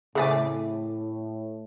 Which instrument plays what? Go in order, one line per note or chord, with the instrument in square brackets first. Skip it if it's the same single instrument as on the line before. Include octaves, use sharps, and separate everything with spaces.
[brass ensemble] A2 [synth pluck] C#3 A3 D6 [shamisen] E3 C4 G#5